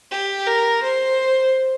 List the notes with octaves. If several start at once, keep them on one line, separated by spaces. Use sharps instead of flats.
G4
A#4
C5